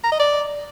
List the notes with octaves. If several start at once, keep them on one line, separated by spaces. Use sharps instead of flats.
A#5
D#5
D5